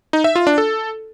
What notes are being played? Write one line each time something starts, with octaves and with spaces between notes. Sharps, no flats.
D#4
E5
F4
D4
A4